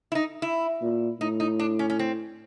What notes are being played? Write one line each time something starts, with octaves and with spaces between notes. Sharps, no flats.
E4
D#4
E4
A#2
A2 D#4
D#4
D4
C#4
C#4
C4